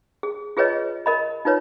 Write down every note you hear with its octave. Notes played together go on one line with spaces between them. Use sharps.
G#4
F4 G#4 B4 C#5 D#5
A#4 D#5 B5
D#4 F4 B4 C#5